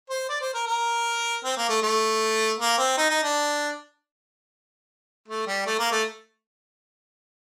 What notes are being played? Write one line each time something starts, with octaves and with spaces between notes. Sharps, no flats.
C5
D5
C5
A#4
A#4
C4
A#3
A3
A3
A#3
C4
D#4
D#4
D4
A3
G3
A3
A#3
A3